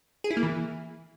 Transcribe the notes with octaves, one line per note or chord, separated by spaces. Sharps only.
G#4
E4
A#3
E3